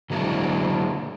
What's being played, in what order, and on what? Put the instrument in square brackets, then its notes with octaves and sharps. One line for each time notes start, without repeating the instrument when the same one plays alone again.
[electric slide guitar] D3 F#3 G#3 A#3 D4 E4